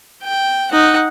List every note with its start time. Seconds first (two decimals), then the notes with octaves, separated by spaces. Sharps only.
0.24 G5
0.71 D#4 F#5